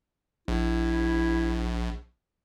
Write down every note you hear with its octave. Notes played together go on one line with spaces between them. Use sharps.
A#1 E4